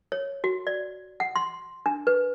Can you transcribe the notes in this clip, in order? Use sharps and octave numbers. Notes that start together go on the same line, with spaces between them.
C#5
F#4
D5
F#5
C6
D4
B4